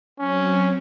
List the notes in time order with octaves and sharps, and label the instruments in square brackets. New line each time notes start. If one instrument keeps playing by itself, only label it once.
[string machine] F#3 C4 [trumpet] C#4